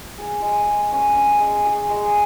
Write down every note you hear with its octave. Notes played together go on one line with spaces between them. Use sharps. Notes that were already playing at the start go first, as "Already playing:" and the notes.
G#4
G#3
G#3
C#4
C#4
G#3
G#4
G#3